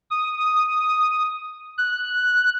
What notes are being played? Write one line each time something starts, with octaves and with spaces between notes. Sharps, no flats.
D#6
F#6